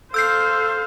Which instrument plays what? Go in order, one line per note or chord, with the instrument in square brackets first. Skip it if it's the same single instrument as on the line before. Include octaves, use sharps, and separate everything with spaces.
[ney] A4 [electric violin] C5 F5 [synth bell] E6 G6 C7